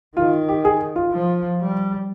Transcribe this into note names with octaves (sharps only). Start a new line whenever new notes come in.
D#3 F4
G4
G#4
F4
F3
G3